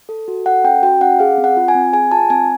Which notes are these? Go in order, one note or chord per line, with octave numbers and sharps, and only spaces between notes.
A4
F#4
A4 F#5
C#4 G5
F#4 G5
C#4 F#5
G#4 F5
C4
F#5
F4
G#5
C4
G#4 G#5
F4 A5
C4 G#5